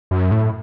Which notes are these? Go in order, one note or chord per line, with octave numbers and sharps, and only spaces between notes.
F#2
A2